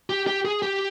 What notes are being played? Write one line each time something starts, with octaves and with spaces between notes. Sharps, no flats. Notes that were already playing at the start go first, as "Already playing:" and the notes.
G4
G4
G#4
G4